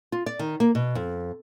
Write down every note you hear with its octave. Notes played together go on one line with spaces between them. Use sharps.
F4
D5
D#3
A#3
B2
F2